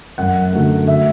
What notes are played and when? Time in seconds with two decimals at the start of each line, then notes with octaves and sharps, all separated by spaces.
0.18 F#2 F#5
0.53 D3 F#3 A3
0.88 E5